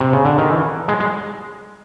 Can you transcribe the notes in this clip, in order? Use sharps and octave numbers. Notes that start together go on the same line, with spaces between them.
C3
C#3
D3
D#3
E3
G#3
G#3